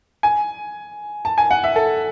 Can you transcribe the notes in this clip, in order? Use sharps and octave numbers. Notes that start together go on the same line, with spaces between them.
G#5
A5
G#5
F#5
E5
A4